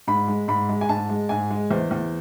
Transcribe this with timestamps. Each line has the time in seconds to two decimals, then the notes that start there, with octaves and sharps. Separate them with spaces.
0.07 G#2 B5
0.28 G#3
0.48 G#2 B5
0.69 G#3
0.81 G#5
0.89 G#2 A5
1.09 G#3
1.29 G#2 G#5
1.50 G#3
1.71 E2 C5
1.91 E2